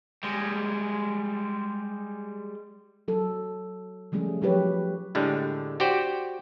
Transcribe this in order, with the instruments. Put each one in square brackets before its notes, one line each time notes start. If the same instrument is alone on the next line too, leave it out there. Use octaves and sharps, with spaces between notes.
[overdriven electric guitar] G3 G#3
[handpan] F#3 A4
F3 G3 A3 C#4 G#4
F3 F#3 G4 B4 C#5
[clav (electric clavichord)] A2 D3 G3 G#3
F#4 G4 C5 D5 G5